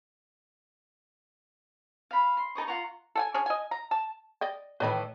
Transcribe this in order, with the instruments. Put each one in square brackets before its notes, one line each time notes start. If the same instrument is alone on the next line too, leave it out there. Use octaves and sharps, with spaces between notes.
[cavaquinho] F5 B5
C6
D#4 A4 D#5 C#6
F4 F#5 A#5 C#6
[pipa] A4 G5 G#5
C#4 D4 G#4
D#5 G#5
A#5
A5
[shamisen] D5 D#5 G5
[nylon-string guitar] A2 D#3 E3 [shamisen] B4 D#5 B5